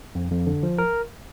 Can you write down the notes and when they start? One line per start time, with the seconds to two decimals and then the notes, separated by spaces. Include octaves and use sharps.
0.15 F2
0.31 F2
0.47 D3
0.63 F3
0.78 A#4